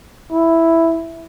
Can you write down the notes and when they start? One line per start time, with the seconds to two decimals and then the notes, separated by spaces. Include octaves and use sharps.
0.31 E4